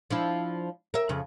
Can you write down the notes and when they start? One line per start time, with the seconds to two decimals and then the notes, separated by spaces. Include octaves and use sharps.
0.10 F3 D4 E4
0.94 A#4 E5
1.09 F2 C#3